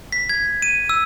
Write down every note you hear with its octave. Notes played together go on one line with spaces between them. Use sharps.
B6
G#6
D#7
E6